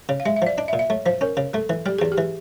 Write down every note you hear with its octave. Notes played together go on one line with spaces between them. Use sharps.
C#3
F5
G#3 E5
E5
F3 D5
D4 D#5
E5
A#2
E5
A3 C#5
F3 C5
C#4 A#4
C#3
A3 A4
E3
G3 G4
E2 G#4
G4
E3